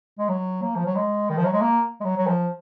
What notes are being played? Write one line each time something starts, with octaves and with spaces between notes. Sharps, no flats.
G#3
F#3
A#3
F3
F#3
G#3
D#3
F3
F#3
G#3
A#3
G#3
F#3
F#3
F3